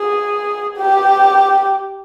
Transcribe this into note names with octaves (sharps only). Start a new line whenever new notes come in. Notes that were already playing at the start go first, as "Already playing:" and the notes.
Already playing: G#4
G4